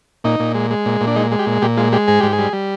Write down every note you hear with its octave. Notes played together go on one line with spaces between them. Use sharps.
A#2 D#4
A#2
G#3
G#3
A#2
A#2
D4
G#3 D#4
G#3
G4
A#2
A#2 G4
G#3 F4
G#3 G4
G#2 G#4
G#2 G4
G#4
G3
G3